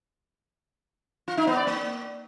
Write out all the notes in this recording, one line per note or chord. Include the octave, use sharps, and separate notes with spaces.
F4
D#4
B3
D5
A#3